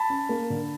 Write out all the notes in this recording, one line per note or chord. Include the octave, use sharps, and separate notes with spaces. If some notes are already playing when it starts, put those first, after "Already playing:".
Already playing: A5 B5
C#4
A#3
D3